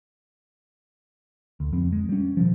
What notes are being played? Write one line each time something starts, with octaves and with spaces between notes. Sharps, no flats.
D2
F2 C4
G#3
G3 C#4
B2 D#3 F3